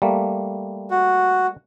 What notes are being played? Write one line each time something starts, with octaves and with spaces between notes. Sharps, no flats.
G3 A3 A#3
F#4